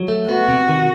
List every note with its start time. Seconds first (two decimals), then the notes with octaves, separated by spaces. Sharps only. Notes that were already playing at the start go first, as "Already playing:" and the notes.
Already playing: F#3
0.08 A3
0.29 B3 F#4
0.49 C3
0.68 D#3